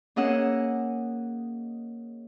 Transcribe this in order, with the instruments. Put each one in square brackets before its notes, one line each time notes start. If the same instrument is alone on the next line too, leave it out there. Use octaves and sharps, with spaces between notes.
[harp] A#3 C#4 G#4 D#5 F#5 E6